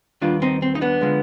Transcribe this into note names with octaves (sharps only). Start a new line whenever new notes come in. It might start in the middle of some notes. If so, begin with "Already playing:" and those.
D#2 D#3 G3 B3 D4 F4
C4 D#4
C4
D#4
B3 D4
D3 F3 G#3